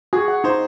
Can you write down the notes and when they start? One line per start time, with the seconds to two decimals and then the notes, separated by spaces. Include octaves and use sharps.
0.13 F#4 G#4
0.28 F#5
0.44 D#4 C5